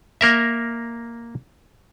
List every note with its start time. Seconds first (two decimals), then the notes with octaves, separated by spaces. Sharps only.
0.21 A#3 A#4 E5